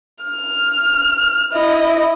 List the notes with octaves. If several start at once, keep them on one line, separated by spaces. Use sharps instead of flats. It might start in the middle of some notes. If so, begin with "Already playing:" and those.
F6
E4 D#5